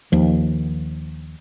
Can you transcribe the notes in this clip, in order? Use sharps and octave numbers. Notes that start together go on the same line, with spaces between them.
D#2 F3